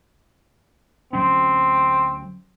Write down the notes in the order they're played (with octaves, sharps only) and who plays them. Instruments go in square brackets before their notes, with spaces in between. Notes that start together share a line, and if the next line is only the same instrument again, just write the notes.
[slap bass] D2 F#3 C#4 [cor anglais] C4